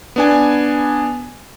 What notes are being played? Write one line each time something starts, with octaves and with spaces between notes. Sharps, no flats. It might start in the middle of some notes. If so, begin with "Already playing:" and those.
B3 D4 G#5